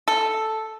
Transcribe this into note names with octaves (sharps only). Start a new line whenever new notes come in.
A4